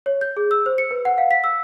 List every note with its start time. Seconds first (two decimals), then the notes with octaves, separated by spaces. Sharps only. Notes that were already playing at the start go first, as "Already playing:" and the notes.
0.06 C#5
0.21 G6
0.37 G#4
0.51 E6
0.66 C5
0.78 C#7
0.91 B4
1.05 F#5
1.18 F5
1.31 B6
1.44 E6